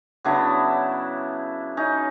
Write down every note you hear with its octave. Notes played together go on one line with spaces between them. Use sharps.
C#3 F#3 B3 D4 E4
C#4 D#4